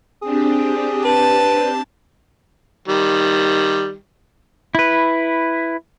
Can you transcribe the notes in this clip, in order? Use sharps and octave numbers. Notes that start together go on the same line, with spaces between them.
C4 D4 G4 G#4
B4 A5
D#3 G3
E4 B4